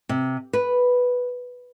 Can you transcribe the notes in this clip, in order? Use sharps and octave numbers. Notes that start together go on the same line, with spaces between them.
C3
B4